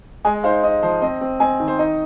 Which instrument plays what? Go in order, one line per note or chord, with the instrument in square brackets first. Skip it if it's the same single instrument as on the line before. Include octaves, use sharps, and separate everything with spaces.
[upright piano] G#3 D#5 G#5
D#4 C5 F5
D#4 D#5
F3 C5
C4 D#5
C4
C4 D#5 G#5
D#3
C5
D#4 D#5